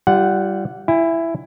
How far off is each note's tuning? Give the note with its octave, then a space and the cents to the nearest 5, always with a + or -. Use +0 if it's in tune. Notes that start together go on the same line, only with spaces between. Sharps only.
G3 -20 F4 -35 F#5 +0
E4 +10 G#5 -35